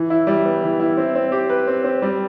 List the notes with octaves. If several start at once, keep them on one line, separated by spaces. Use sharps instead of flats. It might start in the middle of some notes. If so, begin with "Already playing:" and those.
Already playing: E3
E4
G3
B3
E3
E4
C4
C4
G4
B4
C4
C4
G3